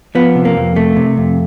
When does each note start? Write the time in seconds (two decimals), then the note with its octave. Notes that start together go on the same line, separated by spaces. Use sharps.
0.15 F3 B3
0.35 C3
0.45 A#3
0.56 F2
0.76 C3 A3
0.96 C3
1.17 F2